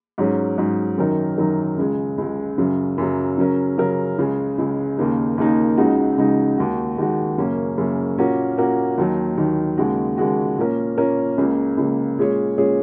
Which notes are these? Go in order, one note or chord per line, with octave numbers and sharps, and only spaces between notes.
G#2 F#3 C#4 G#4
G#2 F#3 C#4 G#4
F#2 D#3 F#3 D#4 A#4
F#2 D#3 F#3 D#4 A#4
C#2 C#3 G#3
C#2 C#3 G#3
F#2 C#3 F#3
F#2 C#3 F#3
C#3 F#3 C#4 A#4
C#3 F#3 C#4 A#4
C#2 C#3 G#3
C#2 C#3 G#3
D#2 C#3 A#3 D#4
D#2 C#3 A#3 D#4
C#2 C#3 G#3 D#4 F#4
C#2 C#3 G#3 D#4 F#4
D#2 D#3 G#3 F#4
D#2 D#3 G#3 F#4
F#2 C#3 A#3 C#4
F#2 C#3 A#3 C#4
A#2 A#3 C#4 F#4 A#4
A#2 A#3 C#4 F#4 A#4
D#2 D#3 F#3
D#2 D#3 F#3
D#2 C#3 G#3 F#4
D#2 C#3 G#3 F#4
A#2 A#3 C#4 A#4
A#2 A#3 C#4 A#4
C#2 C#3 A#3
C#2 C#3 A#3
A#2 G#3 C#4 G#4 C#5
A#2 G#3 C#4 G#4 C#5